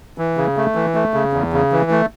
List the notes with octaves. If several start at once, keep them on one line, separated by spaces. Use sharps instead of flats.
E3
C#3
A3
E3
A3
C#3
E2
C#3
E3
A3